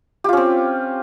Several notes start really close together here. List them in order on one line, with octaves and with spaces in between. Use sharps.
G4 F4 C#4 C4